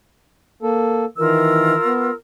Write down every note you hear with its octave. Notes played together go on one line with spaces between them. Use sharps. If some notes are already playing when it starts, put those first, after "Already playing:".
A#3 A4
D#3 E3 F4 A#4 E6
B3